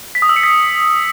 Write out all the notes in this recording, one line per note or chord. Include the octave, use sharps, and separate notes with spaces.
B6
D#6
E6
C#7
B6